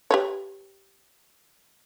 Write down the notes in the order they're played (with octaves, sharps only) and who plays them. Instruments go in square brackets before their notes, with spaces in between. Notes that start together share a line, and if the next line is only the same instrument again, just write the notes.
[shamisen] G4 B4 C#5